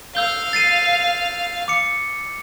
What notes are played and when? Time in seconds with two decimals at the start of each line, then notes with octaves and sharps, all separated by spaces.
0.15 F5 E6 G6 G7
0.53 A6 C7 D#7
1.68 D6 C#7